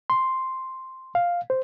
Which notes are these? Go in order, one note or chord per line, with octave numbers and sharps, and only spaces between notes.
C6
F5
C5